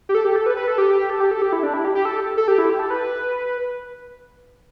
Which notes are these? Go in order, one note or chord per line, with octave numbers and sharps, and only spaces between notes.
G4
A4
G4
A4
B4
B4
A4
G4
A4
G4
A4
G4
E4
D4
E4
G4
G4
A4
A4
G4
E4
G4
A4
B4